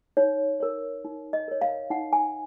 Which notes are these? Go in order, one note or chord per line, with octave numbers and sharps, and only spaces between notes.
D#4 C#5
A#4 C#5
D#4
D#5
A#4 C#5
F5
D#4 F#5
G#5